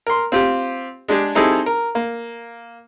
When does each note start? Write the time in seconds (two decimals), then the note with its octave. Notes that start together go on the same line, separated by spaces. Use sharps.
0.07 A#4 C6
0.32 C4 F4 G4
1.08 G#3 D4 G4 G#4
1.35 G3 C4 D#4 E4 G#4 A4
1.66 A#4
1.95 A#3